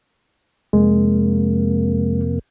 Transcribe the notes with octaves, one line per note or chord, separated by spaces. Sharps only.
F2 C3 G#3 A#3